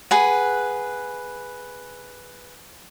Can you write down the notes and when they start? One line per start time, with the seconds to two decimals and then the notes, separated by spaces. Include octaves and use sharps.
0.11 G#4 B4 F#5